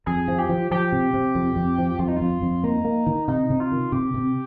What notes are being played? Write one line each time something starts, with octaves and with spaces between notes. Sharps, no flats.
F2 G#4
F3
G4
F3
F3 G4
C3
C3
F2
F2
F3
F2 F4
D#4
F4
F2
F2
A#3 D#4
A#3
D#3
C3 D#4
C3
F4
D#3
C3 G4
C3